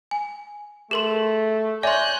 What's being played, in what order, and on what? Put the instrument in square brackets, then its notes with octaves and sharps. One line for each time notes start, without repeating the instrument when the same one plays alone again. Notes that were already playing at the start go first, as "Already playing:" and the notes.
[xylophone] G#5
[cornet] A3 [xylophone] G#4 A#4 C6
[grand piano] C#5 D5 G#5 [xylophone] E5 C6 [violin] F#6 G6